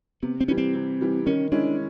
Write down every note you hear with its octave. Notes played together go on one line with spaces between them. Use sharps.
C3 B3
C4
E3 G3 C#4
C4
C3
E3 G3
D#3 C#4
G#3 C#4 D4 E4